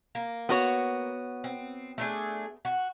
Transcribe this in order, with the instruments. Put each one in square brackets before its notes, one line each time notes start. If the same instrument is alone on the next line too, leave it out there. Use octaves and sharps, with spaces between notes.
[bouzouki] A#3
[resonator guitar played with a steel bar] B3 F#4 C#5
[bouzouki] C4
A3 D4 G#4
F#4